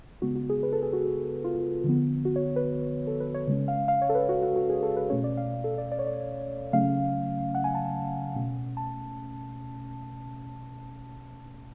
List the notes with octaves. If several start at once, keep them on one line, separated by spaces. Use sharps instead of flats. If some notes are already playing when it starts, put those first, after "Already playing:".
C#3 G#3 B3 F#4
F#4
G#4
B4
A4
G#4
F#4
F4
D3 F3 B3
F#4
C#5
B4
A4
B4
C#5
C#3 G#3 C#4 C#5
F5
F5
C#5
A4
B4
F#4
F#4
F#4
G#4
A4
B4
B2 A3 C#4 C#5
D5
F5
A4
D5
D5
C#5
D5
C#3 F#3 A3 C#4 F5
F#5
G#5
A5
A5
B2 A3 C#4
A5